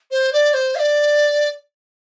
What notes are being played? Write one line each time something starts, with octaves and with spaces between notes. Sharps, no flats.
C5
D5
C5
F5
D5